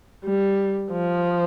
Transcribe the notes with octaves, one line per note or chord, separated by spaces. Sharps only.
G3
F3